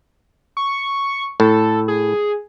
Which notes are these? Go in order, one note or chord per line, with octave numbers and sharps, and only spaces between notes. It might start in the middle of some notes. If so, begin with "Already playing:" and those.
C#6
A2 A4
G#4